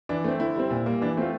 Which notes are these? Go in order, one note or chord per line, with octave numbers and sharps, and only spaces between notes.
E3 D4
A3 C4
D3 E4
G3 C4
A#2
G3 A#3
E3 D4
A3 C4 F4